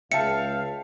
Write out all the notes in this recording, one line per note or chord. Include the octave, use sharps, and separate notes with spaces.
C#2 E5 F5 G5 A5 C#7